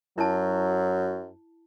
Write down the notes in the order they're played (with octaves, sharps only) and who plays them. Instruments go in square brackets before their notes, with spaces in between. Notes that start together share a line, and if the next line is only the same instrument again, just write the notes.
[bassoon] F#2 [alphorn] F#3 [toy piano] E4 A5